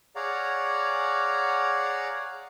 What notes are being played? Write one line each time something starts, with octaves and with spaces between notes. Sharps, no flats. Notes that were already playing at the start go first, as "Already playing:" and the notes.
G#4 C#5 D5 F5 F#5 A#5